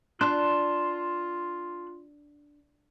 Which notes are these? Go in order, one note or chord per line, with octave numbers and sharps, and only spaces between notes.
D4 F4 A5 C6 F#6